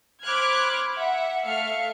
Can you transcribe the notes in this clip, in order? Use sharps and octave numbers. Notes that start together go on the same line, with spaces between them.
C5 B5 D6 F6 F#6 G#6
E5 F#5
A3 E5 F5 F6 C#7